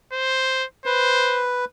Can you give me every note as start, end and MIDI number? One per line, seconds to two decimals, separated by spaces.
0.12 0.65 72
0.86 1.65 71
0.86 1.47 72